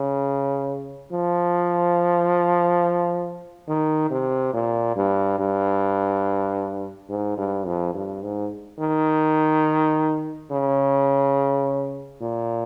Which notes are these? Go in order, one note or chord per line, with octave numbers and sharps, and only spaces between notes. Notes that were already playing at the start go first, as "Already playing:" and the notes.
Already playing: C#3
F3
D#3
C3
A#2
G2
G2
G#2
G2
F2
G2
G#2
D#3
C#3
A#2